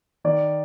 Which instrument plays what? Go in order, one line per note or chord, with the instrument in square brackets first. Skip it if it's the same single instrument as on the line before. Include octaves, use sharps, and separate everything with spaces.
[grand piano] D#3 D5